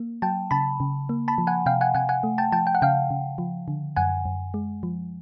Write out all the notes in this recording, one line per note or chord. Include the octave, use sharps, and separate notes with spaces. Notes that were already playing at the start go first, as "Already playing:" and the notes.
Already playing: A#3
F#3 G5 A5
C#3 A5 B5
C#3
A#3
A5 B5
F3
F#5 G#5
C3 F5 G5
F#5 G#5
C3 F#5 G#5
F#5 G#5
A3
G5 A5
F3 G5 A5
G5
F#5
C#3 F5 G5
C#3
F3
D3
F#2 F#5 G#5
F#2
G#3
F3